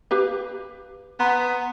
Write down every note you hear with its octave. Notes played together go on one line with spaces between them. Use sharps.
G4 B4 F5
B3 F#5 A#5 C6